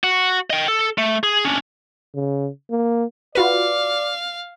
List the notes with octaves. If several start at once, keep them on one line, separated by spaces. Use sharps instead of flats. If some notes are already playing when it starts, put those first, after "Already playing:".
F#4
D#5 G5
A4
A3
G#4
C#4 D4
C#3
A#3
F4 F#4 B4 D5 F5